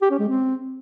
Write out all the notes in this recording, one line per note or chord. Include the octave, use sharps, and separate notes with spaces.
G4
C#4
G#3
C4